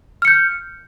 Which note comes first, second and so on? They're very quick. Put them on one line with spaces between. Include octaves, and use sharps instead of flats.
F6 C#7 G6